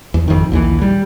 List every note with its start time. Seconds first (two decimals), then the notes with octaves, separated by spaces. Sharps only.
0.14 E2
0.28 G#1 F2 D#3
0.52 A#1 D#2 E3
0.82 G3